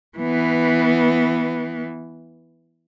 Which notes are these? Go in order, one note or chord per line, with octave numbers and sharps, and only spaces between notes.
E3 B3